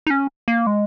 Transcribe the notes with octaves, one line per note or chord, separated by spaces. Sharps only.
D#4
C#4
A#3
G#3